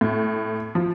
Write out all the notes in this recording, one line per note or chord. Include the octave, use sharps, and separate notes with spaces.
A2
F3